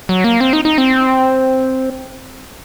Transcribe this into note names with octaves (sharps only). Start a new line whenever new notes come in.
F#3
A#3
C4
D#4
D#4
C4